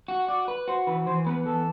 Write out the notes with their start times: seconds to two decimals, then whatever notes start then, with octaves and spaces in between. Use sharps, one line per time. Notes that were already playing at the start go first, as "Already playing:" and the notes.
0.08 F#4
0.28 F#4 D5
0.48 B4
0.68 F#4 C5
0.87 E3 B4
1.07 E3 C5
1.26 B3 B4
1.46 E3 A4